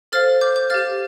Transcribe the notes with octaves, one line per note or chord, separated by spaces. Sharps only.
A4 C5 F5 F6 A6
D6 G6
D6 G6
G4 F5 F6 A6